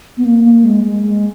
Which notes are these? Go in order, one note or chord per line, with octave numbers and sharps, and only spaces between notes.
B3
A#3
A#3
G#3
G#3
G#3